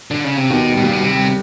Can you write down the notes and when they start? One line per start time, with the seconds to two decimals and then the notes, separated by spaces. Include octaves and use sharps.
0.11 D3
0.24 C#3
0.37 C3
0.50 D#2 B2
0.71 G3
0.77 B2
0.84 A#2
0.91 B2 G3
1.04 C3
1.10 G3